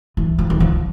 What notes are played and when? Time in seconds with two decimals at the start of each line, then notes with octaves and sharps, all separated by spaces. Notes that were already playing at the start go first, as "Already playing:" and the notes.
0.17 E3
0.39 F3
0.50 E3
0.60 F3